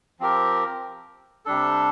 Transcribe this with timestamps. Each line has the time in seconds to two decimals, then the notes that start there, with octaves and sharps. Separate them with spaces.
0.20 F3 C4 G4 A#4
1.46 C3 G3 D4 A4